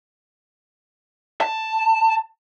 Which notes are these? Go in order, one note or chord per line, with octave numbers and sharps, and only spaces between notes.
A5